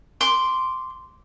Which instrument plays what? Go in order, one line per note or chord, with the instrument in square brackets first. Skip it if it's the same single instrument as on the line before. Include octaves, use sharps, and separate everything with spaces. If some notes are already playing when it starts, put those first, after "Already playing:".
[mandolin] C6 D6